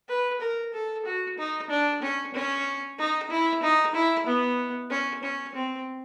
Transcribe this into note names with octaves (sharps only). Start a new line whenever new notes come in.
B4
A#4
A4
F#4
D#4
D4
C#4
C#4
D#4
E4
D#4
E4
B3
C#4
C#4
C4